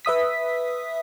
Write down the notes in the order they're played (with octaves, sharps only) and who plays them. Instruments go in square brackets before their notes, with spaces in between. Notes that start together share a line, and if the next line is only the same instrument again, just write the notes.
[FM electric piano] B4 E5 D#6 B6